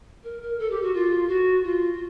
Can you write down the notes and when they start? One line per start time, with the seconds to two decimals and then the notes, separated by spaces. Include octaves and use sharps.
0.23 A#4
0.41 A#4
0.58 A4
0.70 G4
0.82 F#4
0.93 F4
1.28 F#4
1.63 F4
1.93 F4